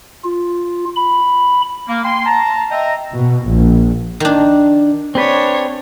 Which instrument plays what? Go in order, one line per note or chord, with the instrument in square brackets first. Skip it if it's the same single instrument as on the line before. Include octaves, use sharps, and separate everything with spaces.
[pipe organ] F4
B5
[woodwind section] A#3
A#3 G5 G#5 C6
A5 A#5
D#5 E5 G5 A#5
[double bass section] B2
A#1
[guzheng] D#3 D4
[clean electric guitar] C4 G#4 B4 [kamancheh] D4 C#5